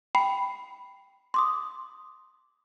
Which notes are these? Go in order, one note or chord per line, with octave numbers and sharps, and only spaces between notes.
G5 B5 C7
C6 D6 D#6